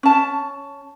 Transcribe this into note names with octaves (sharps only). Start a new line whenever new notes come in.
C#4 A5